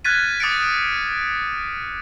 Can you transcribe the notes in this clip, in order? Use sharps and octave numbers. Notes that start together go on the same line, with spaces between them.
F6 F#6 G#6 A6 B6 D#7
D6 D#6 A6 B6 C#7 D7